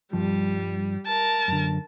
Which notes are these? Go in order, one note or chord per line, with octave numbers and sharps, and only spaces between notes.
G2 F3 G3
A#4 A5
F#2 D3